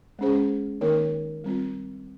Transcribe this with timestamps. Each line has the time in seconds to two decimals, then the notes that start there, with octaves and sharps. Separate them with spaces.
0.19 G#3 C#4 G#4 C5
0.81 D#3 A#3 D#4 A#4 C#5
1.44 G3 C4 F4